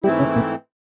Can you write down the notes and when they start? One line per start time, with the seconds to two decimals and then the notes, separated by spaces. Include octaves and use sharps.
0.04 G#2 E3 G3 A3 C4 E4 G4
0.19 C#3 C#4
0.35 A#2 A#3